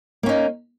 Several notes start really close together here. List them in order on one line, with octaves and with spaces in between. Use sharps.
A#3 C#4 D#4